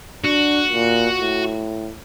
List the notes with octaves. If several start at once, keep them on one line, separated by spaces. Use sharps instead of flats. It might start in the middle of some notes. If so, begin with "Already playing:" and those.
D4 F#4
A#2
A2